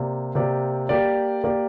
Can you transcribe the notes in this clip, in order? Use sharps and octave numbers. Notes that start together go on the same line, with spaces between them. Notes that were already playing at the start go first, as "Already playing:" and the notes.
Already playing: C3 A#3 G4 D5
C3 A#3 G4 D5
A#3 G4 D5
A#3 G4 D5